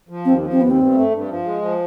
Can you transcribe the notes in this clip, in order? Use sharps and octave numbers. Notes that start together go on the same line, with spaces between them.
F3
D#2 C4
F3
C4
D#2 B3
C4
G2
A3
G2
F3
G#3
F3